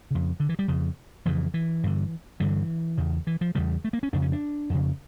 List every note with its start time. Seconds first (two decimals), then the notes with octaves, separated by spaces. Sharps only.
0.11 F2 C#3
0.40 D3
0.49 E3
0.59 G3
0.68 F2 C#3
1.25 F2 C#3 E3
1.54 E3
1.83 G2 D3
2.40 G2 D3 E3
2.98 E2 C#3
3.27 E3
3.41 F3
3.55 E2 C#3 G3
3.84 A3
3.93 A#3
4.03 C#4
4.13 F2 C#3 D4
4.22 C#4
4.32 D4
4.70 F2 C#3